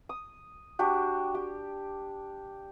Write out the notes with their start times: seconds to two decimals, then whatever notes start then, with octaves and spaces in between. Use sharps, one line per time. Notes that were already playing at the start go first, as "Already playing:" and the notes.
0.09 D#6
0.79 D4 F#4 G4
1.35 G4